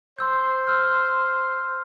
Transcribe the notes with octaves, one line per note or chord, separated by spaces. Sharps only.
C5 C6 E6 G6
E6 F6